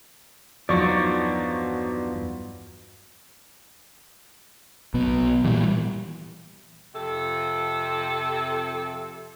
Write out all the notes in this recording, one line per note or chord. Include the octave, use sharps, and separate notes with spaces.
E2 G2 F3 F#3 B3 D#4 D5 C#6
B1 B2 B3
A#2 E3 G3
F2 C3 A4